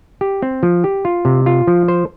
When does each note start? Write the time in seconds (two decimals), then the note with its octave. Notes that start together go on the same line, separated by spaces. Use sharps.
0.21 G4
0.42 C4
0.63 F3
0.84 G4
1.05 F4
1.25 C3
1.46 F4
1.68 F3
1.88 C5